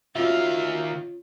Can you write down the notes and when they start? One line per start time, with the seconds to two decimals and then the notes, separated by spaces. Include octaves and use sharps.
0.15 D#3 C#4 F4 F#4 E5 F5